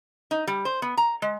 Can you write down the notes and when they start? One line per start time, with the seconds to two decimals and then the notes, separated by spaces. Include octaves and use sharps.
0.31 D#4
0.47 G3
0.65 C5
0.82 B3
0.97 A#5
1.22 G#3